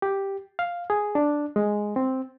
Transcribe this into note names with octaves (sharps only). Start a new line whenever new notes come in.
G4
F5
G#4
D4
G#3
C4